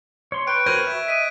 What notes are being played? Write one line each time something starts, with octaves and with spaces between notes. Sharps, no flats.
C#5 C6
B4 G5 C#6 F#6 D7
F#4 A#4 C5 G#6 A#6 D#7
E5
D#5 B6 D#7